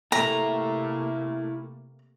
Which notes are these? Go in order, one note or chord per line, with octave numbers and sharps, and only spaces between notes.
C3 A3 A#3 E4 A4 A#5